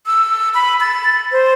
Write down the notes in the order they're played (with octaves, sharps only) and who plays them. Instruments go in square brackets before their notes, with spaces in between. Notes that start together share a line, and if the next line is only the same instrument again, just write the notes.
[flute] E6
B5
A6
C5